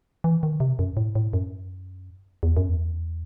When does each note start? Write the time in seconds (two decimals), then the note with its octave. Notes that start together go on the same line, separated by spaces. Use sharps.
0.24 E3
0.43 D#3
0.60 C3
0.79 F#2
0.97 A2
1.15 A2
1.33 F#2
2.43 E2
2.57 F#2
2.69 E2